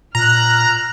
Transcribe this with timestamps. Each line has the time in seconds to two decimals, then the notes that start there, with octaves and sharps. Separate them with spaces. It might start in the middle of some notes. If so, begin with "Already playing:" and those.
0.15 A#2 A#5 F6 F#6